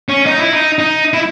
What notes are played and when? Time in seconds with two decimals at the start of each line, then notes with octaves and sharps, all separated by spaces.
0.09 C#4
0.26 D#4
0.39 E4
0.53 D#4
0.79 D#4
1.13 E4